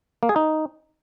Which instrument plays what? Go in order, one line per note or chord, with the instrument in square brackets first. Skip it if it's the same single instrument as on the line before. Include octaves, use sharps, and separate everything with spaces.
[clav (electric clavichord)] A#3
G#4
D#4